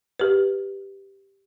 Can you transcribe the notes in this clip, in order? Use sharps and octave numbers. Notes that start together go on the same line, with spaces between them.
G4 B4